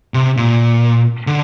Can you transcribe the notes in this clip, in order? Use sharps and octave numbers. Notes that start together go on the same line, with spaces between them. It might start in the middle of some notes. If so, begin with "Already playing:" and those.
C3
A#2
D3